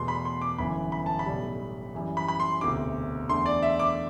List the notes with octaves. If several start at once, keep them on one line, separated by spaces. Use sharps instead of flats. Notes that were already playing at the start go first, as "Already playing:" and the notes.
Already playing: E2 B2 A3 C6
B5
C6
D6
G1 F#2 E3 B5
B5
A5
B5
B1 A2 G3
F#2 E3 G3
B5
B5
C6
E1 D2 C3 D6
E2 D3 A3 C6
D5
E5
D6